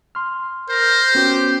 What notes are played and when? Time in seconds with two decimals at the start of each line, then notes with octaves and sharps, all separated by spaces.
0.15 C6 F6
0.70 A#4 C5
1.15 B3 C#4 F#4 G4